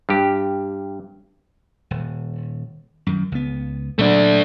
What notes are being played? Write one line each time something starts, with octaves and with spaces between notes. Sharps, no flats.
G2 G4
D#1
F#2 D#3
C#2 B3
A#2 F#3 A3 D4